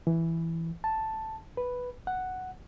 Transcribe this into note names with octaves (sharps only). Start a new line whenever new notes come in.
E3
A5
B4
F#5